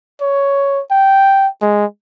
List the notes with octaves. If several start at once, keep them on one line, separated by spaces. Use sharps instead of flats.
C#5
G5
G#3